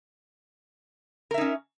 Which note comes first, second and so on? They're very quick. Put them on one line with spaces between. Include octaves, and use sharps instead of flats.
A#4 E5 D#4 C#4